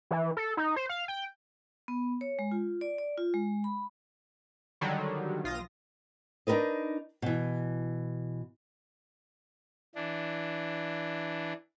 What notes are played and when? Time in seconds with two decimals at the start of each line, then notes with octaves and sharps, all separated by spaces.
0.11 E3
0.37 A4
0.57 D#4
0.76 C5
0.89 F5
1.08 G5
1.88 B3
2.21 C#5
2.39 G#3
2.51 F4
2.81 D5
2.98 D5
3.18 F4
3.34 G#3
3.64 B5
4.81 D3 D#3 F#3 G3
5.44 B1 F4 D#6 A#6
6.47 D4 D#4 F#4 A#4 B4 D#5
7.22 B2 E3
9.95 E3 D4